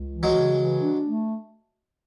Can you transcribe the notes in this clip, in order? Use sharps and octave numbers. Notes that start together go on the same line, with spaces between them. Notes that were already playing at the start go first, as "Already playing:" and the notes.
Already playing: C#2
E3
F#3 G#3
C#3
E3
D4
A3